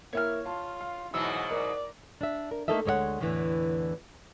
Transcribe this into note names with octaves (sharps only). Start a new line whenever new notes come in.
A#3 E4 A#4 C#5 F6
F4 A5
F5
G#2 B2 E3 F#3 E6
A#4 D5
D4 E5
A#4
A3 A#3 D#4 A4 D#5 E5
D2 G#3 C#5 D#5 F#5
E2 A2 D3 E3